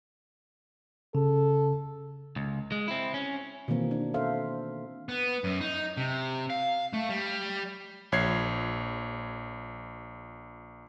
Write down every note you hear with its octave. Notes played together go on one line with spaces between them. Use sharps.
C#3 A4
C#2
G#3
C4 E4
C#4
B2 D#3 E3 A#3 C4
D4
A4 C5 E5 F5
B3
F#2
D#4
C3
F5
A3
G3
A#1 C#5 G#6 C7